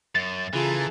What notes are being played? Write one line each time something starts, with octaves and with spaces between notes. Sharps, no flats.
F#2 A6
C#3 E3 F4 G#4 A4 A#5